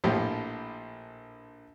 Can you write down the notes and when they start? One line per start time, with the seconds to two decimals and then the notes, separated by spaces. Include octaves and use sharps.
0.04 A#1 A2 F3 G4